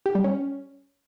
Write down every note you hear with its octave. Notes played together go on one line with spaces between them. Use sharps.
G4
G3
C#4